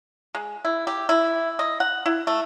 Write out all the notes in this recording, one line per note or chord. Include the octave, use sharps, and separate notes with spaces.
G#3
E4
G4
E4
D#5
F#5
E4
A3